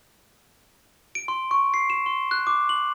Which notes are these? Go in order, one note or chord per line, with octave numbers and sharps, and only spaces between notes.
D7
C6
C#6
C7
E7
C6
F#6
D6
F#7